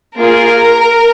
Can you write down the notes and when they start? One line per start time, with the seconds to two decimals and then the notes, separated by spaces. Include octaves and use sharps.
0.17 A#3 F4 G#4 A#4